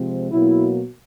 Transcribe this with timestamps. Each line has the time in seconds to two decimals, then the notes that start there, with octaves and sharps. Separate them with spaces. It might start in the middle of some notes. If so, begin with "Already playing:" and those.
Already playing: C3 F3 G#3 C4
0.32 B2 F#3 A#3 E4